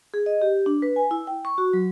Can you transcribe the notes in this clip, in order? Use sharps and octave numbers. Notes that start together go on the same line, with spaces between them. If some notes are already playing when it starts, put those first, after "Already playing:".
G#4
D#5
G4
D4
B4
G#5
E4
G5
C#6
F#4
F#3